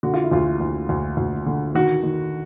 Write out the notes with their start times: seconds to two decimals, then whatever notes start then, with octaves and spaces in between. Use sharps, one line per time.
0.03 D3 F#4
0.14 F4
0.23 E4
0.31 D2 F4
0.60 D2
0.89 D2
1.17 D2
1.46 D3
1.75 D#3 F#4
2.03 D#3